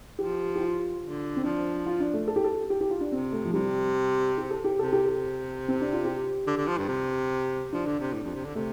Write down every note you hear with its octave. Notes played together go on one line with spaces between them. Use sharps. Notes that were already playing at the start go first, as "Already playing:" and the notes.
F3 G4
G4
F4
D3
C4
F3 D4
F4
D4
A3
A4
G4
A4
G4
G4
F4
D4
C3 C4
A3
F3
C3 G3
G4
A4
G4
C3 A4
G4
A4
C4
D4
F4
G4
D3
D3
F3
G2
C3
F3 D4
D3
C3
A2
F2
C3
D3
C3 A3